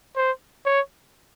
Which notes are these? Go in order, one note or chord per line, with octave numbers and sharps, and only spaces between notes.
C5
C#5